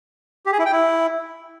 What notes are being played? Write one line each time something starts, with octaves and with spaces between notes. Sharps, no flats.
G4
G#4
E4
G5
E4